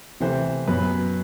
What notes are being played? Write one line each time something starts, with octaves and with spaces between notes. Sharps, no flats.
C3 E3 A3 C5
F#2 F#3 B3 B4